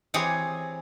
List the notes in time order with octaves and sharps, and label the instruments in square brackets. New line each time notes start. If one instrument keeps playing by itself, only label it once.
[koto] E3 C4 G4 G#4 C#5